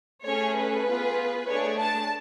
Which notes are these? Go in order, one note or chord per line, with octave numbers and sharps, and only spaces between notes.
A3 C#4 G#4 C#5
B4
B3 F4 G#4
A3 D4 G#4 C#5
A5